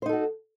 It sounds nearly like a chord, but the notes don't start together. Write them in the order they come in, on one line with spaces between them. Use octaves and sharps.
C5 D#4 A4 F#4